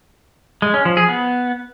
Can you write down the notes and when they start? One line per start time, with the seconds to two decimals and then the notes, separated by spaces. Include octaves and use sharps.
0.62 G#3
0.74 C#4
0.85 F3
0.97 G#4
1.08 B3